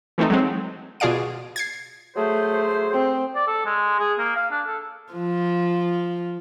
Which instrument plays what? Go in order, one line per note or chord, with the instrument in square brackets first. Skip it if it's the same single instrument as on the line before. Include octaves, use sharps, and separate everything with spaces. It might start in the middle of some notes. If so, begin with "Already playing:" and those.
[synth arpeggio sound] E3 A3 C4 D#4 A4
F#3 G#3 C4
B2 F4 G#4 D5 F5 D7
G#6 A6 C7
[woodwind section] F#3 G#4 C5 [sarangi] A3
[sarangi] C4
[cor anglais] D5
A4
G#3
G#4
A#3
F5
D4
A4
[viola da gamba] F3